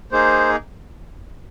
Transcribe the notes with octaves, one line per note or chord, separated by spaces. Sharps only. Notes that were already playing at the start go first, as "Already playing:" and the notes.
A#3 D#4 G#4 C5